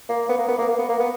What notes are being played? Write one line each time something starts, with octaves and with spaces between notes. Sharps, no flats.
A#3
B3
A#3
B3
A#3
A#3
B3
A#3
B3